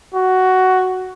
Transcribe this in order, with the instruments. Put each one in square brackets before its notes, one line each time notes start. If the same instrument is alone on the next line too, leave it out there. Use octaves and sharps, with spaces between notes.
[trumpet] F#4